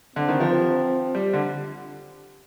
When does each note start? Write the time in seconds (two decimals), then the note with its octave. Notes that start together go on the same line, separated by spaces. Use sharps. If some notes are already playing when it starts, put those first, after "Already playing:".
0.16 D3 C4
0.28 D#3
0.40 F3
0.53 F3
1.15 G3
1.33 D3